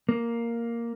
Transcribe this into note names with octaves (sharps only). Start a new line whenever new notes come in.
A#3